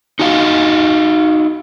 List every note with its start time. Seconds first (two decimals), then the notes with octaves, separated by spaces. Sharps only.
0.19 D#4 F#4 D#5 F5